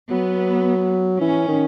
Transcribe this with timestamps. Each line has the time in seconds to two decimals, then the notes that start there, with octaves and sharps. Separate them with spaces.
0.10 F#3 B3
1.21 E3 C#4
1.48 D#3